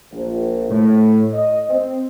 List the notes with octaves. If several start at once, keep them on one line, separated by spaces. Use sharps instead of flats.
A#1
A2
D#5
C4